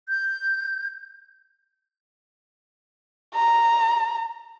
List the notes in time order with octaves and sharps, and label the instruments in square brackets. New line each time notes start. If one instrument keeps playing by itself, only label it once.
[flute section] G6
[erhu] A#5